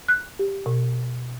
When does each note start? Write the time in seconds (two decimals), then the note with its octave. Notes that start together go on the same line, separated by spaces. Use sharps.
0.08 F#6
0.39 G4
0.66 B2